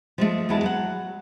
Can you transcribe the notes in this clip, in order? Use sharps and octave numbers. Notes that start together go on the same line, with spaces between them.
F3 G#3 A3
E2 F#3 G#3 E4 A5
F#3 F#5